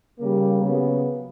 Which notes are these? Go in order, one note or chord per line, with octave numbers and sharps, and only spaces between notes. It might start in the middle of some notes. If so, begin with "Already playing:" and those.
C#3 G3 A#3
C#3 F#3 B3